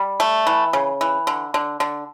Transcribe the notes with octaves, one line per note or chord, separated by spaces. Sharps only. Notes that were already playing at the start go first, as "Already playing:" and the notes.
Already playing: G3
A3
E3
C#3
E3
D3
D3
D3